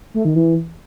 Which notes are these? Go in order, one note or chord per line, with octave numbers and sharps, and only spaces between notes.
A3
D#3
E3